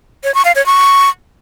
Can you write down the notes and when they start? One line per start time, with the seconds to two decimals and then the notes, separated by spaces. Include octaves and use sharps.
0.24 C#5
0.34 C#6
0.45 F5
0.55 C#5
0.66 C#6